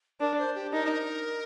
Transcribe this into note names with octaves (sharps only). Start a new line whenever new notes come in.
D4 A#4
C5
G4
D#4 A#4